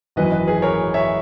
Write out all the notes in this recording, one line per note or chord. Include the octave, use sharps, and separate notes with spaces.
G#1 F#2 E3 B4 D#5
B4 D#5
G#4 B4
A#4 C#5
C#5 E5